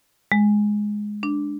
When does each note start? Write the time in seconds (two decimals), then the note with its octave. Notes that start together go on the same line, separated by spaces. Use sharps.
0.32 G#3
1.23 D4